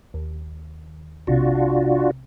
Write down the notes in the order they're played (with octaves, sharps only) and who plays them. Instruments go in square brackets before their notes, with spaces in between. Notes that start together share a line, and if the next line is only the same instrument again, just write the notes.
[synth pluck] D#2
[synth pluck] B1 C3 [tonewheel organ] D4 F4 F#4